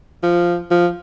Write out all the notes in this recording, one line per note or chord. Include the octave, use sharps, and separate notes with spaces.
F3
F3